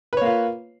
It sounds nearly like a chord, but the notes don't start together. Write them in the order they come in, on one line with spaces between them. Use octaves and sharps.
B4 C#5 A#3 F4